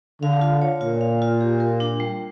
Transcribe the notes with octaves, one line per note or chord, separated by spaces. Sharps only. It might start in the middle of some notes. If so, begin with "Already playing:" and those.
D3 F5
F4
C#5
A#2 F4
F5
F4
G4
A#4
D4
G3